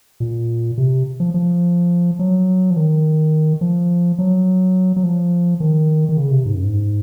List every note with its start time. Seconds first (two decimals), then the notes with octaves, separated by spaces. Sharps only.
0.20 A#2
0.78 C3
1.20 F3
1.34 F3
2.19 F#3
2.70 F3
2.77 D#3
3.61 F3
4.19 F#3
4.96 F#3
5.03 F3
5.60 D#3
6.09 D#3
6.17 C#3
6.31 C3
6.45 G#2
6.54 F#2
6.64 G#2